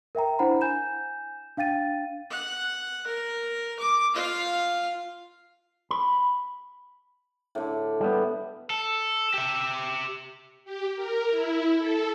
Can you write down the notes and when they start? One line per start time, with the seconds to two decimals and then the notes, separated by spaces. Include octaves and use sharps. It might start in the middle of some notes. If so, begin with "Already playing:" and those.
0.15 A#4 E5 G5 A#5
0.39 D4 E4 C5 F#5 A#5 B5
0.61 G#5 G6 E7
1.57 D4 F5 G5 A6 D#7
2.30 F#5
3.07 A#4
3.80 D6
4.14 F4 F5
5.91 B5
7.55 A2 D3
8.00 G3 B3
8.70 A4
9.34 G4 E5
10.65 G4
10.95 A#4
11.30 E4
11.78 A4